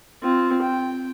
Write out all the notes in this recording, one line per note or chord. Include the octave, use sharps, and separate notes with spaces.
C4 F4
G5